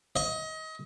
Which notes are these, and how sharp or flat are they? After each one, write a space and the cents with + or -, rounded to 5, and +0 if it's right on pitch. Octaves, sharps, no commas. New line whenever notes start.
D#5 +30